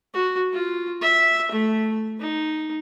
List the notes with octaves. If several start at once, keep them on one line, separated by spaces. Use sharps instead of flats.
F#4
F4
E5
A3
D#4